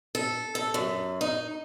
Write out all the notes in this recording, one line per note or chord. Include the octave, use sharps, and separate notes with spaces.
A4
A4
F#2
D#4